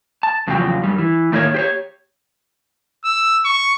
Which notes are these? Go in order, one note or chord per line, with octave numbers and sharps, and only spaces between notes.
A5
E2 C#3 F3 F#3 G5
F#2 G3
E3
A2 D#3 A3 A#3 D4 C#5
G4 C5 C#5
E6
C#6